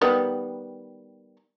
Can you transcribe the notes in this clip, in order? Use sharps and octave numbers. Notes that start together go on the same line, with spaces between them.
D#3 G3 B3